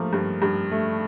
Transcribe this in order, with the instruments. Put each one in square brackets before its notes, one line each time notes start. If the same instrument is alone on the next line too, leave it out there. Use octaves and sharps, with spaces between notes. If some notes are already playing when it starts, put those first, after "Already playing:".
Already playing: [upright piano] F3 A3 [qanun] A#3
[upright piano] G2
G2
A3